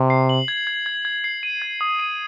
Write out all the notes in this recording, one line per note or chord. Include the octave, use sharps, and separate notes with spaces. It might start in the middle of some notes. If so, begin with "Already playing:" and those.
Already playing: C3
C7
F#7
G#6
G#6
G#6
G#6
C7
D#7
G#6
D#6
D#7